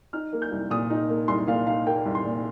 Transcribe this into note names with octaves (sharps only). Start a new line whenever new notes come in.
D#4 F6
A#3
G6
C2
A#2 D#6
D#4
A#3
C2 C6
A#2 F5
D#4 F5
A#3 G5
C2
C6
A#2